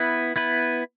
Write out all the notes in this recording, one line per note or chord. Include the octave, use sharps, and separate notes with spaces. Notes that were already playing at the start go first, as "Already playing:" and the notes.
Already playing: B3 E4 B4
B3 E4 B4